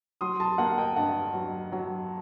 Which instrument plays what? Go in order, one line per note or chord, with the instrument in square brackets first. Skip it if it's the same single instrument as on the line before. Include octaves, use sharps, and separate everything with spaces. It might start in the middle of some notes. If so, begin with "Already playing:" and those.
[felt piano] F#3 [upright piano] C6 D#6
[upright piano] A5 C6
[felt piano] A#3 [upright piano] F#5 A5
[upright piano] D#5 G5
[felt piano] G2 [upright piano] F#5 A5
[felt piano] F#3
F#3